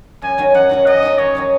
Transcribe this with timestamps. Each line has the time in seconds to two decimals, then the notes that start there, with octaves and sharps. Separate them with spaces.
0.22 F#2 G#5
0.38 D#3 F#3 C#4
0.54 F#2 F#5
0.70 D#3 F#3 C#4
0.86 F#2 D#5
1.02 D#3 F#3 C#4
1.18 F#2 C#5
1.35 D#3 F#3 C#4